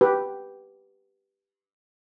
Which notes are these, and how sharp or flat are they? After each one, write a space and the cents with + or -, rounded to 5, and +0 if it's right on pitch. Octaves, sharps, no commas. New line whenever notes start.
G4 +0 B4 +0